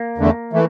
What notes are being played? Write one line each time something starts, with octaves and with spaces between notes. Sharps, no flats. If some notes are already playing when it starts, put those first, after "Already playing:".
Already playing: A#3
E2 D3 A3
E3 A3